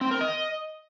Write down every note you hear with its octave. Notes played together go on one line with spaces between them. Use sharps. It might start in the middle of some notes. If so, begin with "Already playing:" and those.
C4
A#4
D#5